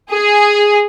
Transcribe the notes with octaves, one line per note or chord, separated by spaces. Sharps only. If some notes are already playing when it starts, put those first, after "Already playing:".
G#4